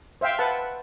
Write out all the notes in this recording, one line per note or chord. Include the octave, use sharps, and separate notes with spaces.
C5 E5 F5 G5
B4 F#5 A5